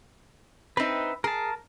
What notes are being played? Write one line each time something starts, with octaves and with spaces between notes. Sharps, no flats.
C4 D#4 B4 E5
G#4 A#4 A5